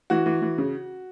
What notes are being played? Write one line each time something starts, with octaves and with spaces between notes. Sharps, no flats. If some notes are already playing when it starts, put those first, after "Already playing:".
E3 F#4
E3
E3
C#3